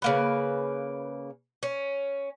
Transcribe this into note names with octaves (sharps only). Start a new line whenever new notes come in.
C#3 A#3 B4
C#4